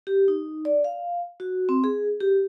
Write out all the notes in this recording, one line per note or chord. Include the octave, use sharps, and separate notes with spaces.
G4
D#4
D5
F5
F#4
C4
G#4
G4